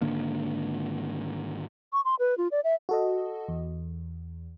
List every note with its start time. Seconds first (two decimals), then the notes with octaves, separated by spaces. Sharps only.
0.01 G#1 D3 A#3
1.93 C#6
2.05 C6
2.19 B4
2.38 F4
2.51 D5
2.64 E5
2.89 F#4 A4 D#5
3.48 E2